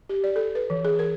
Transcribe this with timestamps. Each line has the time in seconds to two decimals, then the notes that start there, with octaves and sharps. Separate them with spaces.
0.09 G4
0.24 D5
0.36 A4
0.55 B4
0.70 E3
0.85 G#4
0.99 A#4